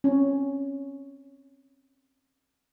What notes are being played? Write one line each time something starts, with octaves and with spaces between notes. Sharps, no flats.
C4 C#4